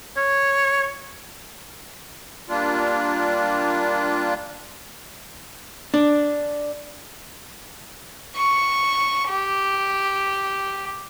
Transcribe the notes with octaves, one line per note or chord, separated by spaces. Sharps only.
C#5
G3 A#3 D4 F4
D4
C#6
G4